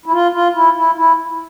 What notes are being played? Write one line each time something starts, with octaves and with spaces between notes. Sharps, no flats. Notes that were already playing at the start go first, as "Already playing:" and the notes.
E4
F4
F4
E4
E4
E4